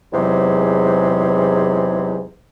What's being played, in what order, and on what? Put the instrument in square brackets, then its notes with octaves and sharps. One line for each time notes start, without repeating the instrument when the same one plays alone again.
[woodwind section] E2 G#2 C3 F#3